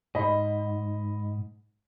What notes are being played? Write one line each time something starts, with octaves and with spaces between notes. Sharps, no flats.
G#2 D#5 B5